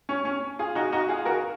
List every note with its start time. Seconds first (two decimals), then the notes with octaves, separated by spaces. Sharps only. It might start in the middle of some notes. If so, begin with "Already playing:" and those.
0.09 C#4
0.25 C#4
0.59 F4 G#4
0.75 D#4 F#4
0.92 D#4 F#4
1.09 F4 G#4
1.25 F#4 A#4